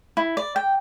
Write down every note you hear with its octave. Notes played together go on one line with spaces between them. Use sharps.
E4
D5
G5